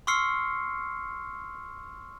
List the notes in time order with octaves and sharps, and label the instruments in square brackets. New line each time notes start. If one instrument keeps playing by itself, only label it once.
[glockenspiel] C6 C#6 E6 F6 C7 C#7